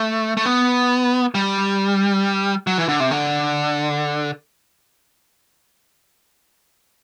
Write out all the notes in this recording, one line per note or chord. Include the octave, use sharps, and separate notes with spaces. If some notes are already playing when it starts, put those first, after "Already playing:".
Already playing: A3
A3
B3
G3
F#3
E3
D3
C3
D3